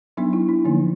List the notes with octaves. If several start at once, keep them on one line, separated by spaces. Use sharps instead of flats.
F#3 B3 D4 D#4
E4
D4
D3 F3 A#3 D#4